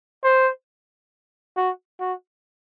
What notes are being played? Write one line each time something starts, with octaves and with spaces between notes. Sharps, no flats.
C5
F#4
F#4